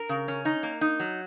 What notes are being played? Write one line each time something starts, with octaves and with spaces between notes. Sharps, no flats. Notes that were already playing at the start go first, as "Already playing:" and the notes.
Already playing: A#4
C#3
C#4
D#4
A#3
D#4
F#3